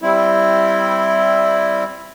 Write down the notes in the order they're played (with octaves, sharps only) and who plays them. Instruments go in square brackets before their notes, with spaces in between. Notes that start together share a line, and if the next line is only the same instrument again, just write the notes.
[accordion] G3 C4 E4